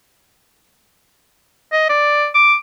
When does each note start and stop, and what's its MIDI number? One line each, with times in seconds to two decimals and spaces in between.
1.73 1.88 75
1.89 2.27 74
2.35 2.55 86